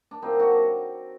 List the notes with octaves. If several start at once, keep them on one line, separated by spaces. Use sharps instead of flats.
D4
A#2 F#3 A#3 C4 D#4
D4 F#4